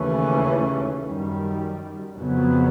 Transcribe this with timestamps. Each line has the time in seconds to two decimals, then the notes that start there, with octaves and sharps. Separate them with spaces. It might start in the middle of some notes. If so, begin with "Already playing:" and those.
Already playing: D#2 C#3 E3 A3 C#4
1.04 F#2 D#3 G3
2.17 F2 C#3 F#3 B3